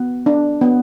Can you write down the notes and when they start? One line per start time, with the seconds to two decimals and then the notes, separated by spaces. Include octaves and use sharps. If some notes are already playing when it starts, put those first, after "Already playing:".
Already playing: B3
0.26 D4
0.61 B3